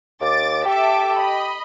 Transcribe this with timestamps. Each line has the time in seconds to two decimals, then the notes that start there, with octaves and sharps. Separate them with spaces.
0.21 D#2 D6 A6
0.66 G4 A4 E5 D6
1.16 D#5 B5